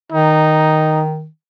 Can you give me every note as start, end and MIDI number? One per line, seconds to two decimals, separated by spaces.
0.12 1.28 51
0.12 1.02 63